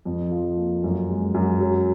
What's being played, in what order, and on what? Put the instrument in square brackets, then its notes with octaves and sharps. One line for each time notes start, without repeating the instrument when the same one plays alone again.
[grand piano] F2
F3
A#3
F#2
G#3
F#2
F#3